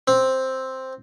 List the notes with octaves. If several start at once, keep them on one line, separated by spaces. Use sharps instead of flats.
C4